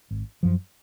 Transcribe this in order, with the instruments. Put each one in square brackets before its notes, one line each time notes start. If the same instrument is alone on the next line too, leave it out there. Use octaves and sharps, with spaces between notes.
[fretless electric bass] G#1
F#2 F3